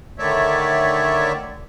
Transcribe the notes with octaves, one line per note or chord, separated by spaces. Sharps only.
D3 D#3 A3 C#5 D5 E5